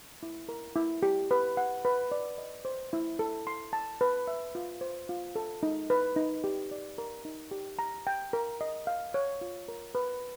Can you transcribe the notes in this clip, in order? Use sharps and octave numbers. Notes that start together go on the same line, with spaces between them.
E4
A#4
E4
G4
B4
F#5
B4
D5
D#5
C5
E4
A4
C6
A5
B4
E5
F4
C5
F4
A4
D#4
B4
D#4
G4
D5
A#4
D#4
G4
A#5
G5
A#4
D#5
F5
C#5
F4
A#4
B4